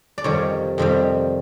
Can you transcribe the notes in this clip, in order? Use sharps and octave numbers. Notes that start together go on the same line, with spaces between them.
D5
F2 C3 D#3 G3 C#5
F2 C3 D#3 G3